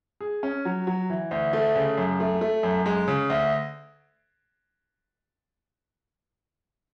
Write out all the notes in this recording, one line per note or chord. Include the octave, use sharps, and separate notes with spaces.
G#4
C#4
F#3
F#3
E3
D2
A3
C#3
F#2
A3
A3
F#2
G#3
C#3
D2